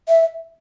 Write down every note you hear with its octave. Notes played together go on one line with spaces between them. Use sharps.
E5